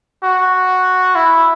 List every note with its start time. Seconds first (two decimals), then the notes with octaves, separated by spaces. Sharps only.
0.23 F#4
1.15 E4